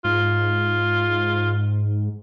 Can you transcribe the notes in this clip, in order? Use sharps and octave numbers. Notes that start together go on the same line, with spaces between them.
G#2 F4